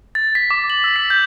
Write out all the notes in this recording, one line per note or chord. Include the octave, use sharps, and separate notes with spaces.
A6
B6
D6
F#7
E6
B6
G6